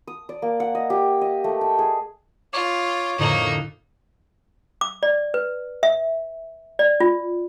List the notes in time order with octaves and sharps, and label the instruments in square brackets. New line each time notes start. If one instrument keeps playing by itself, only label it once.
[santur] D#6
D5
A#3
F#5
D#5
G4
D#5
A3
G5
G#4
[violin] F4 [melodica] C#5 D6
[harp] F2 A2 D3 [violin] A#3 D#4
[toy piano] D6
D5
B4
E5
D5
F4